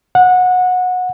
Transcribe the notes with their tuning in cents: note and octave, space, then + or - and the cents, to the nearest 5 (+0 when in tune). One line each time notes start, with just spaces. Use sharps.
F#5 -20